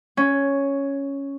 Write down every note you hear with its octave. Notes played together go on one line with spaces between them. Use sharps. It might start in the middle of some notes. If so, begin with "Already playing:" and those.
C#4